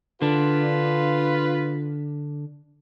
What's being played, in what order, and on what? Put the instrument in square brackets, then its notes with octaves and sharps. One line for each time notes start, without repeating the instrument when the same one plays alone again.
[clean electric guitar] D3 D4 [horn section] F4 B4